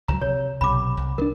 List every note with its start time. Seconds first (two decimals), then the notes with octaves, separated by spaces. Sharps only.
0.08 C#2 D#3 F#3 A#5
0.21 C3 C#5
0.61 B1 C3 B5 D6
0.97 C2
1.18 F3 D4 A#4